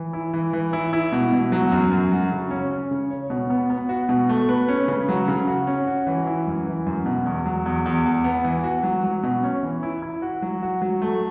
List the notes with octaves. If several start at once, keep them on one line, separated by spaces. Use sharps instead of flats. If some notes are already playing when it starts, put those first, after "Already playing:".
Already playing: E3
E4
E3
E3
E4
E4
B2
B2
F#3
F#2
F#2
F#3
C#3
C#4
C#4
C#3
C#5
B2
B3
B3
F#4
B2
A3
B4
C#4
C#3
F#3
C#3
F#4
C#4
F#4
E3
E4
F#2
E3
F#2
B2
E2
F#3
E2
E2
E2
B3
E3
F#4
F#3
F#3
B2
C#4
E3
E4
E4
F#4
F#3
F#4
F#3
A3